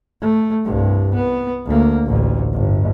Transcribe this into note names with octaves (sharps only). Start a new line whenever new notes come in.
A3
C2 G2
B3
D2 A#3
A1 D2
G1